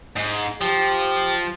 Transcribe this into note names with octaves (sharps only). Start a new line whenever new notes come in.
G#2
F3 G4